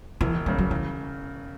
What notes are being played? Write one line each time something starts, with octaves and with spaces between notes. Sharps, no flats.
E1 E3
E2 C#3 G#3
F#3
C#3 E3